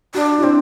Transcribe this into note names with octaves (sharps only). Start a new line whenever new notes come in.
D4 F#4
E4
C4 D4